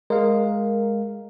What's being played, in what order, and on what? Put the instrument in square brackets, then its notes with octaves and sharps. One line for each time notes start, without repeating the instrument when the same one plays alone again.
[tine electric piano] G#3 F5 [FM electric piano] A#4